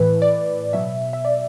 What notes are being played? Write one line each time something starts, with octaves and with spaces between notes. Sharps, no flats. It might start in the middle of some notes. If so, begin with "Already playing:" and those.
Already playing: A2 E3 B4
D5
B2 F#3 E5
E5
D5